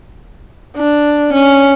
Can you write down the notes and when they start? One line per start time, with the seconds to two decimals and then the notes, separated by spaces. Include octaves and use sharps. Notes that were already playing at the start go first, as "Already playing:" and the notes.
0.77 D4
1.33 C#4